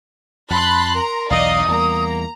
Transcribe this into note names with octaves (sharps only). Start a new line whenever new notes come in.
F2 A5 B5 C6 F#6
A#4 A#5 C6
B1 E2 E3 D#4 D5 D#5 F5 D#6
E2 G3 A#3 A#5